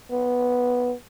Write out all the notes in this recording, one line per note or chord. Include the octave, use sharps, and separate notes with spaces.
B3